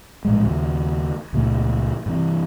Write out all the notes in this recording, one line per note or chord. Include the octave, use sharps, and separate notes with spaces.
A#1 A2 G3 G#3
D#2 C#3
C#2 A#2 F3 A3
G2 C3 E3